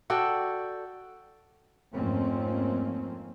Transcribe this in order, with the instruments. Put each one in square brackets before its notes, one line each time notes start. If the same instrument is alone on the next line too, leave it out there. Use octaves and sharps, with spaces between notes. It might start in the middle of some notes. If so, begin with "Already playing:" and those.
[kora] F#4 A4 D5 G5
[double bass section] F2 G#2 A3 A#3 C4 C#4